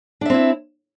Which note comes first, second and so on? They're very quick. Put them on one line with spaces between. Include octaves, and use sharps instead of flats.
D4 E5 C4 E4